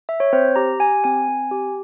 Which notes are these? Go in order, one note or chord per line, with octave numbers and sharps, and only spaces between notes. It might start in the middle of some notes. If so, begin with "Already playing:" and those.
E5
C#5
C4 C5
G4 A#5
G4 G#5
C4 G#5
C4
G4